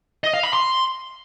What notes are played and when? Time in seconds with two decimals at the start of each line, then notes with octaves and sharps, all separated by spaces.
0.24 D#5
0.34 F5
0.43 B5
0.53 C6